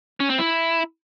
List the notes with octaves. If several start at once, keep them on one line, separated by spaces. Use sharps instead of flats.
C#4
C4
E4